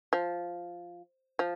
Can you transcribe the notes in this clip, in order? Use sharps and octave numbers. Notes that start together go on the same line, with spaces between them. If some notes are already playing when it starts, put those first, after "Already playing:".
F3
F3